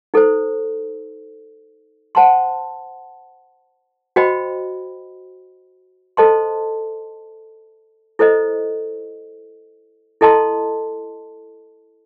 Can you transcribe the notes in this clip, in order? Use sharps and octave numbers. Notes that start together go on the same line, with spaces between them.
D#4 A4 C5
C5 F#5 A5 C6
F#4 C5 D#5 G5 B5
A4 C5 D#5 A5 C6
E4 A4 C5 D#5
E4 A4 D#5 A5 C6